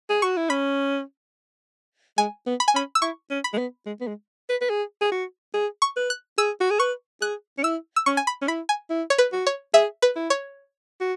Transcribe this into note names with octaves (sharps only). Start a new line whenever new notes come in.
G#4
F#4 C#6
E4
C#4 B5
G#3 G#5
B3
B5
G#5
C#4 B5
E6
E4 C#6
C#4
B5
G#3
B3
G#3
B3
G#3
B4
B4
G#4
G#4
F#4
G#4
C#6
B4
F#6
G#4 E6
F#4
G#4
B4 C#6
G#4 F#6
C#4
E4 E6
E6
C#4 C#6
G#5
B5
C#4
E4 B5
G#5
E4
C#5
B4
F#4
C#5
G#4 E5
B4
E4
C#5
F#4